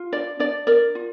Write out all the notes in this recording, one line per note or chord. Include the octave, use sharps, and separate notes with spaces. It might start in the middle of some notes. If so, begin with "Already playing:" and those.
Already playing: F4
D4 D5
D4 D5
A#4 D5
F4